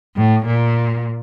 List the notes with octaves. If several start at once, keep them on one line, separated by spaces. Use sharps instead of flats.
A2
A#2